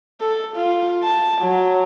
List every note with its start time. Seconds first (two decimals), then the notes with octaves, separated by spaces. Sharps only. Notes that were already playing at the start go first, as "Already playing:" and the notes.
0.21 A4
0.56 F4
1.04 A5
1.41 F#3